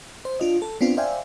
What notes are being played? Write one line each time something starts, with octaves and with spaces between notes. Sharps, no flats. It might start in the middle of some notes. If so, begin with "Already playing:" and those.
C5
D4 F4 D#5
A4
B3 C4 D4 F4
C5 D5 E5 F5 G5 G#5